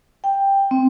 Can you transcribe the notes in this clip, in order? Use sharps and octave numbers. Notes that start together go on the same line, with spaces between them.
G5
C4